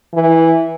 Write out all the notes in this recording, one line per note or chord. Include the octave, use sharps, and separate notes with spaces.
E3